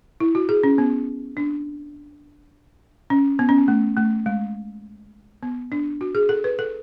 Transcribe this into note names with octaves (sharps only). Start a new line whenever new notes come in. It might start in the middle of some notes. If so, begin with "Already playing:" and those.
E4
F#4
G#4
C#4
B3
D4
C#4
B3
C#4
B3
A3
A3
G#3
B3
D4
F#4
G#4
A4
B4
A4